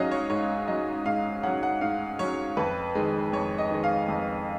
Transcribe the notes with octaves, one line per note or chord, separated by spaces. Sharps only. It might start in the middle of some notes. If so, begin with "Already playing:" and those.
Already playing: G#2 F#3 C#4 D#5 F5
C#5
G#2 C#5
F#3 C#4 D#5
G#2 F5
F#3 C#4 F#5
F#5
G#2 F5
F#3 C#4 C#5
F2 B4
D#3 G#3
F2 C#5
D#5
D#3 G#3
F5
F2